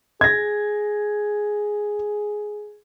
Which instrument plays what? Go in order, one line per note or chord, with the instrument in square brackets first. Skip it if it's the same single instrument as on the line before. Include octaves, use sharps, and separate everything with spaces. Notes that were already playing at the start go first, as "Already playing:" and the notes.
[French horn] G#4 [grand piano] G#6 A#6